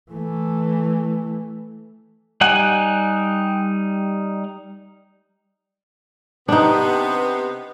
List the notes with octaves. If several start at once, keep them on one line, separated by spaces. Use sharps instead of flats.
E3 A3
G3 D#4 F#5 G#5 F#6
C3 B3 D4 D#4